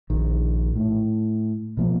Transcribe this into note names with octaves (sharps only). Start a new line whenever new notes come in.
A#1 D#3
A2
B2 F3 A#3